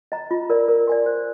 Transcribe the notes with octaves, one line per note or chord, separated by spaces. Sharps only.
D#5 A#5
F4
A#4 D5
A#4
D5 G#5 C6
C5